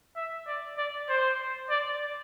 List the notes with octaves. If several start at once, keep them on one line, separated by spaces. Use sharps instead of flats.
E5
D5
D5
C5
D5